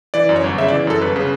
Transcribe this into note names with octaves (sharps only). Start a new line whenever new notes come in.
E3 D5
F#2
C#5
G1
C#3 E5
D5
E3
F#2 A4
G1 B4
C#3